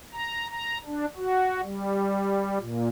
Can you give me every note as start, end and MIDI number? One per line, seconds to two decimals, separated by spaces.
0.12 0.47 82
0.50 0.78 82
0.86 1.05 62
1.17 1.61 66
1.63 2.58 55
2.59 2.89 46